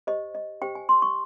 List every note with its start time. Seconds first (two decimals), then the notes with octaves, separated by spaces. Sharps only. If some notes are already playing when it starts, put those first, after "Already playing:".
0.07 G4 C5 D#5
0.35 D#5
0.62 G4 C5 G5
0.75 G#5
0.89 C6
1.02 C#6